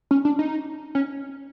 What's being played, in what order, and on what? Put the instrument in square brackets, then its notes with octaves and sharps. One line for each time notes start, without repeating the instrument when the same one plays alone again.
[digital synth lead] C#4
D4
D#4
C#4